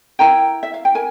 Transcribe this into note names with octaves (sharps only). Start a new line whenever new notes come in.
E4 A#4 G5 A#5
E5
F5
G5
A#4 G#5